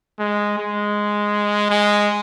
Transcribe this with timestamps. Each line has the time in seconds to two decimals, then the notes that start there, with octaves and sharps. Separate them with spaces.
0.19 G#3
0.58 G#3
1.70 G#3